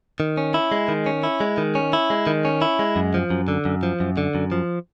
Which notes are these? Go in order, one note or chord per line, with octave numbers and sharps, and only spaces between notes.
D#3
C#4
E4
G#3
D#3
C#4
E4
G#3
D#3
C#4
E4
G#3
D#3
C#4
E4
G#3
F#2
F3
F#2
D3
F#2
F3
F#2
D3
F#2
F3